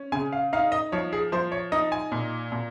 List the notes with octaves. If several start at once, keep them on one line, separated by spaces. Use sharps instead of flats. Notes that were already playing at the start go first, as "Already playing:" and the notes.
Already playing: C#4
C#3 G#5
F5
D#4 F5
D#5
F3 C#5
G#4
F3 C5
C#5
D#4 D#5
G#5
A#2
A#2